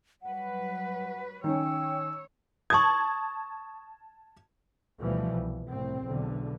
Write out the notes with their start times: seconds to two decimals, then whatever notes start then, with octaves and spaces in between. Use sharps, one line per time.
0.23 F#3 G3 B4 F#5
1.44 D#3 C#4 C#5 G5 E6
2.70 A5 C#6 D#6 G#6
5.01 D2 B2 E3 F3 G3
5.33 C2
5.68 C2 A2 C4
6.05 B1 E2 D3